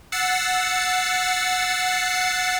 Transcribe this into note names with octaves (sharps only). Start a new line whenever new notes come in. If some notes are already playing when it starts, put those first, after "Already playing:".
F#5 E6 A6 C7 C#7